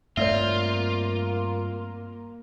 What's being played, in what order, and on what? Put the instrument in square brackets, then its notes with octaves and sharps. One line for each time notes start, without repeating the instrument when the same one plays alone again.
[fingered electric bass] G2 A3 C4 [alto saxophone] A#3 [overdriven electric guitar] F4 [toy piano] C#5 D5 E5